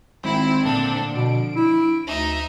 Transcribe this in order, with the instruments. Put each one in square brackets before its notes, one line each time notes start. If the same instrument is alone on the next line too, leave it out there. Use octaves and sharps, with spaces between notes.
[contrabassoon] G#1 [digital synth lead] C4 [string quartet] E4
[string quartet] A#2 D4 A4 [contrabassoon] D3
[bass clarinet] B2 [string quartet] F3 [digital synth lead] D7
[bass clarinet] E4
[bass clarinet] D2 [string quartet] D#4 E5